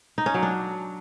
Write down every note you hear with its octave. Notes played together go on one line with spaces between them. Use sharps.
D#4
C#4
F#3
D4